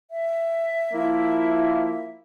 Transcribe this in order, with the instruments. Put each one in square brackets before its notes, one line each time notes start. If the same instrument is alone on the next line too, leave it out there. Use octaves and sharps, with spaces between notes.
[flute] E5
[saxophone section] F3 A#3 E4